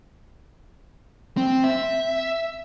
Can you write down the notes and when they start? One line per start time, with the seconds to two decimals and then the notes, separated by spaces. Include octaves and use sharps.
1.37 C4
1.64 E5